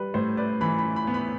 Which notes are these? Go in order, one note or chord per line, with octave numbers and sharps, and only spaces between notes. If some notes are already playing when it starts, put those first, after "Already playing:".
Already playing: G3 B4
A2 C5
B4 D5
E3 B5
B5
B5
B3
B5